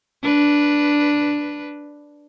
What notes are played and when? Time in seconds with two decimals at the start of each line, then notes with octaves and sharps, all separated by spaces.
0.22 D4 B4